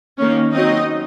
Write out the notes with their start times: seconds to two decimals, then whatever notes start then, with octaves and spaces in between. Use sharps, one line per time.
0.18 D#3 A#3 C#4
0.54 F#3 C4 D#4 D#5